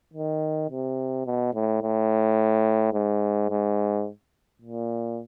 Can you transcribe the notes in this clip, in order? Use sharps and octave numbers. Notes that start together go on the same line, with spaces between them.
D#3
C3
B2
A2
A2
G#2
G#2
A#2